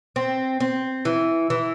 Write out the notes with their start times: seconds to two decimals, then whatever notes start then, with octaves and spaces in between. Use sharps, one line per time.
0.16 C4
0.60 C4
1.05 E3
1.50 E3